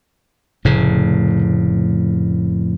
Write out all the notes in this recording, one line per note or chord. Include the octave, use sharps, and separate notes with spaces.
F1 A2 C#3